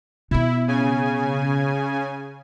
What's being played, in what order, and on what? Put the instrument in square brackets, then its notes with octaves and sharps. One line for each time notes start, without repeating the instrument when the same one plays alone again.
[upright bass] B2 B3 [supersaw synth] E4
[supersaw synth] C#3 G#5